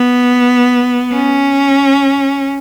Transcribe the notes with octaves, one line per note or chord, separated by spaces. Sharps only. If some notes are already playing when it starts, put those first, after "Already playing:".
Already playing: B3
C#4